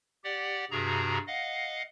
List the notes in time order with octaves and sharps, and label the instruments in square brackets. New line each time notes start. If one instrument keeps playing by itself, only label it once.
[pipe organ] G4 D5 F#5
G2 C3 F#4 G#4 A#5
D#5 F5 F#5